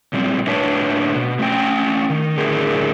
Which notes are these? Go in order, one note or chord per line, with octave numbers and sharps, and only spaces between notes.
A#2 G3 C4
A2 D4 B4 C#5 A5
B2
A3 C#4 G5
D#3
A2 D3 G#4 A#4